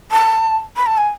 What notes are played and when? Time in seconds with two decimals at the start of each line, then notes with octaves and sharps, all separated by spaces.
0.12 A5
0.76 B5
0.86 A5
0.98 G#5